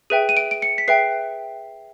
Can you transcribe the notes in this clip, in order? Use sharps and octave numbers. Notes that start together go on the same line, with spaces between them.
G#4 B4 E5 G5 D#7
D#7
D7
D7
C#7
B6
G#4 B4 E5 G5 C7